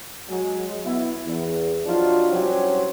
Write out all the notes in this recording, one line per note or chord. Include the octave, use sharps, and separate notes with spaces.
F#3 G#3
B3 E4
E2
F3 F#3 D4 D#4 F4
C2 F#3 C#4 G4 C5